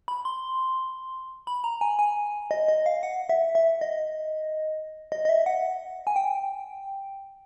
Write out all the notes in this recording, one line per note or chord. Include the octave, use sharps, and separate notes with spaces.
B5
C6
B5
A#5
G#5
G#5
D#5
D#5
F5
F#5
E5
E5
D#5
D#5
D#5
E5
F#5
G#5
G5